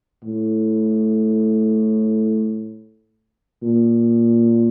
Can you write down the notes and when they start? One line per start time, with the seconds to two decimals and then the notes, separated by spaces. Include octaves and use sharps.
0.25 A2
3.63 A#2